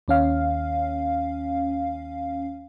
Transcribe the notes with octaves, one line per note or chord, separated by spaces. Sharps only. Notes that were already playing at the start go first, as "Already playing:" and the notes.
D#2 C#4 F5